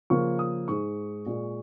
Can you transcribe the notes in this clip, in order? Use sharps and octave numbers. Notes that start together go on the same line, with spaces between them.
C#3 F3 A#3 C#6
D#6
G#2 G#3 C#6
A#2 G#3